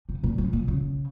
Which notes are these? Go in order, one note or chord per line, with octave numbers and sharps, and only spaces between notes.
C3
A#2
F#2
A#2
C#3